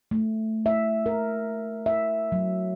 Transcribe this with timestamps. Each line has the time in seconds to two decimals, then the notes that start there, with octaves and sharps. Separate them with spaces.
0.11 A3
0.66 E5
1.06 A#4
1.86 E5
2.32 F#3